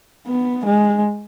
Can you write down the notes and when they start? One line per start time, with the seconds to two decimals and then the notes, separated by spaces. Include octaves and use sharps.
0.27 B3
0.66 G#3